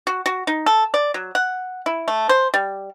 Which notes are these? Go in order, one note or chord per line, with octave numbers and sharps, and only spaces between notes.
F#4
F#4
D#4
A4
D5
F#3
F#5
E4
A3
C5
G3